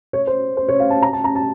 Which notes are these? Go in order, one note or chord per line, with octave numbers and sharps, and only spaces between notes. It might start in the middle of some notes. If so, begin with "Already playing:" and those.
C#5
C5
C5
C#5
F5
A5
A#5
A5
A#5
A5